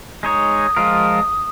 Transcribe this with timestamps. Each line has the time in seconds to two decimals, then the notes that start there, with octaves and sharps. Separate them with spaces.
0.23 G#3 D#4 C#5 D#6
0.77 F3 G#3 F4 A#4